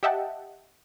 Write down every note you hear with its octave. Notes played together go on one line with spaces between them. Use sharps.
G4 D#5 E5 F#5 G5 A5